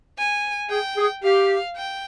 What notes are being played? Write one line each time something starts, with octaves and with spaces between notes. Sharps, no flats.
G#5
G#4 G5
G#4
G4 F5
G5